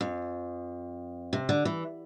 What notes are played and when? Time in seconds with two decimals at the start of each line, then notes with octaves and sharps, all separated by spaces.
0.01 F2
1.33 C3
1.49 D3
1.65 E3